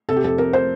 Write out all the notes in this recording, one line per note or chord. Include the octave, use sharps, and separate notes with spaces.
C3 A4
G4
F2 A4
F2 A#4
C5